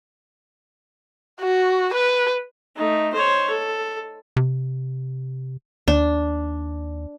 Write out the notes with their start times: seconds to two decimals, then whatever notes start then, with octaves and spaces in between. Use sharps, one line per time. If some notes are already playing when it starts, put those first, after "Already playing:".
1.41 F#4
1.94 B4
2.77 A3 D#4
3.14 C5 C#5
3.50 A4
4.36 C3
5.88 D#2 D4